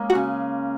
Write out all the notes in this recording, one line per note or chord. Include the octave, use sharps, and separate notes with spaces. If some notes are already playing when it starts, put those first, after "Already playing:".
Already playing: G#3 A#3 C#4
F#4
C#3